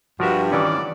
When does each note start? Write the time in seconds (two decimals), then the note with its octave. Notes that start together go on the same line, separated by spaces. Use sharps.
0.20 G2 F3 F#4 A#4 E5
0.52 D#3 E3 C#4 D5